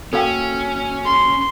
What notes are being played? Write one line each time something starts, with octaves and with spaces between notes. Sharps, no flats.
A#3 C#4 F#4 A4 F5 G5 E6
C6